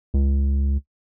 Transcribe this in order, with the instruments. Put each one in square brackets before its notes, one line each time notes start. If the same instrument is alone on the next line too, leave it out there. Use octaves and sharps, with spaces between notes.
[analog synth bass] C#2